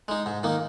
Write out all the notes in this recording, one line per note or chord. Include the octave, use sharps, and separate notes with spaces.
G#3 D#4
G#2
D#3 A#3 D#4